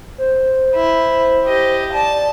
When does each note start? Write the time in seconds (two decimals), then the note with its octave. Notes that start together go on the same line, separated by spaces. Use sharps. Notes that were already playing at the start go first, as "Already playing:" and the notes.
0.18 C5
0.75 E4
1.46 G4 D#5
1.94 D5 A5